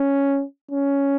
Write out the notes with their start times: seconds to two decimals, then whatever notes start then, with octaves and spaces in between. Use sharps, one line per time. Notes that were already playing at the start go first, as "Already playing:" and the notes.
Already playing: C#4
0.71 C#4